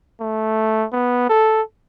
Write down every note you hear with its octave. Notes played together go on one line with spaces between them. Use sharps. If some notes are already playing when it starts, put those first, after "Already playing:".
A3
B3
A4